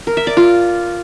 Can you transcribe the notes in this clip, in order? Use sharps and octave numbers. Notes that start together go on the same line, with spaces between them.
A#4
E5
D5
F4